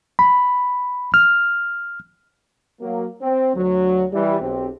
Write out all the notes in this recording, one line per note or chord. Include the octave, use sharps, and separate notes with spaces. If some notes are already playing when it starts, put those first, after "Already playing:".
B5
F6
F#3 A#3
C4
D2 F#3
E3 G3
B1 C4 G4